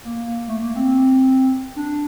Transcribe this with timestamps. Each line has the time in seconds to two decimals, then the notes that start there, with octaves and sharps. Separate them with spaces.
0.05 A#3
0.48 A3
0.62 A#3
0.76 C4
1.76 D4